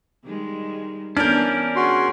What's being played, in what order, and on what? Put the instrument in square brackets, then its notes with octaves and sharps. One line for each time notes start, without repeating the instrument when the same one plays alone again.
[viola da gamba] D#3 G3 G#3
[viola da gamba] E3 B3 [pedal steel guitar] C#4 A#4 [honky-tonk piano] D4 G6
[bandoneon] F#4 C6 [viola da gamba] G#4